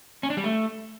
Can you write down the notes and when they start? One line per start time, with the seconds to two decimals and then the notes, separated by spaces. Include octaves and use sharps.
0.23 C#4
0.30 D4
0.37 G3
0.44 A3